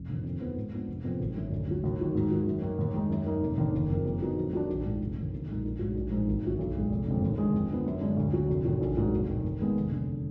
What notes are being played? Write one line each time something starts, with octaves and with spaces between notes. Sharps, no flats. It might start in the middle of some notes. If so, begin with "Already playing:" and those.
Already playing: F1
D#2 D3 F3
F2
F3 B3 D#4
G#2
F3 B3 D4
F1
F2 F3 B3
G#1
F#2 D3
D2
D3 F#3
D#2
D#3 F#3 A#3
G#2
D#3 F#3
F#2
D#3 A#3
D#2
D#3 G#3 D#4
F#2
D#3 A#3 D#4
F1
D#2 D#3 A#3 D4
F#1
F2 F3 A#3
F2
D3 F#3 B3 D#4
F2
D#3 F#3 D4
A#1
G#2 F3
F1
D#2 D3
B1
A#2 G#3 D#4
A#1
G#2 F#3
A#1
A#2 F3 G#3 D#4
G#1
F#2 D3 F#3
B1
A#2 G#3
F1
F2 D3 G#3
D#2
D3 G#3
F2
D3 F3 B3
F#2
D3 G#3 D4
D2
D3 F#3
F1
D#2 D#3 F#3
A#1
G#2 F#3 A#3
F1
D#2 D#3
D#2
D#3 G#3 B3
F1
D#2 D3